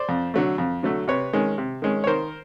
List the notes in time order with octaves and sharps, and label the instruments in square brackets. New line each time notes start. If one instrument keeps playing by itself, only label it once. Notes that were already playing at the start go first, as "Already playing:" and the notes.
Already playing: [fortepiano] C5 D5
F2
D3 F#3 A3
F2
D3 F#3 A3
C3 B4 C#5
D#3 G#3 C#4
C3
D#3 G#3 C#4
C#5
D#3 A#4 C5